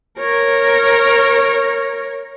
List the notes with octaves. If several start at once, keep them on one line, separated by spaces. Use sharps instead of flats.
A#4 C#5